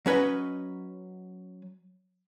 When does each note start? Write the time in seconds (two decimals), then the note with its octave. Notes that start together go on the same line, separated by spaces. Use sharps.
0.06 F#3 C#4 B4 C#5 D#5